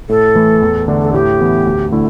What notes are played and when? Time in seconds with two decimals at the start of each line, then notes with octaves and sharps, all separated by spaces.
0.09 A2 A4
0.35 E3 A3 E4
0.62 E2
0.88 D3 A3 D4 A4
1.03 A4
1.13 A2 G4
1.40 E3 B3
1.65 D2
1.92 D3 A3 E4